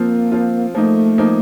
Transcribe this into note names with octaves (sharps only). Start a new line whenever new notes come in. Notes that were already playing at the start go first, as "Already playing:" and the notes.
Already playing: F3 A#3 C4 F4
F3 C4 F4
F3 A3 A#3 D#4
F3 A#3 D#4